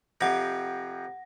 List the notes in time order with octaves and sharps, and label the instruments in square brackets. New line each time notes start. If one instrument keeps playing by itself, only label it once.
[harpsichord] F2 C3 [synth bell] F#5 A#6